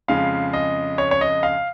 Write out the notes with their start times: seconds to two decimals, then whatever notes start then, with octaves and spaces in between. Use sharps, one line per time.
0.08 F2 C#3 G#3 F5
0.53 D#5
0.98 C#5
1.11 C#5
1.21 D#5
1.43 F5